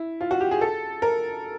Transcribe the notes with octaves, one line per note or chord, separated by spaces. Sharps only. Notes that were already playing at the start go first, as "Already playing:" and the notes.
Already playing: E4
F4
F#4
G4
G#4
A4
A#4